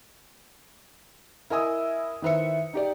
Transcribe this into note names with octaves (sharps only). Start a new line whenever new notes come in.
E4 A#4 D#5 G#5 D#6 E6
D#3 E4 B4 C5 E5 C#7
D#4 G4 D5